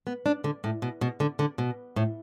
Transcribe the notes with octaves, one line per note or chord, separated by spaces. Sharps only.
B3
D4
D3
A2
B2
B2
D3
D3
B2
A2